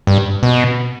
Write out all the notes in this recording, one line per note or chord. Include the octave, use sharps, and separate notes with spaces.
G2
B2